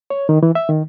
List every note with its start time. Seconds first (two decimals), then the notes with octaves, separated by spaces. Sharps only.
0.10 C#5
0.29 D#3
0.43 E3
0.55 E5
0.69 D#3